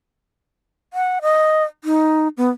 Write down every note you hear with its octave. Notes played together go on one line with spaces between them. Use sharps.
F#5
D#5
D#4
B3